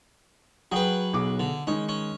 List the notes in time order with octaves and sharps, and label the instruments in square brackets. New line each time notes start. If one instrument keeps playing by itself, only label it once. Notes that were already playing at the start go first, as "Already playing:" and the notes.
[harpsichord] F#3 B4 [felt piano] G#4 G5
[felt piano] B1 G#4 D6
[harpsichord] D3
[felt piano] D#3 G#3 D#4 [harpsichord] C#4
[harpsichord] C#4